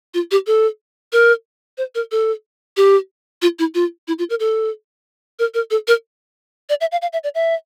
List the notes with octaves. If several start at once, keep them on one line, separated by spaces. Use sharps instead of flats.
F4
G4
A4
A#4
C5
A#4
A4
G4
F4
E4
F4
E4
F4
A#4
A4
A#4
A#4
A4
A#4
D5
E5
F5
F5
E5
D5
E5